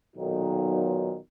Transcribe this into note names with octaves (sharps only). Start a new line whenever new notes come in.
B1 A#2 D#3 F#3